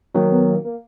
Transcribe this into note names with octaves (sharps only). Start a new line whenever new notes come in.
D#3 F#3 A#3
B3
A#3
A#3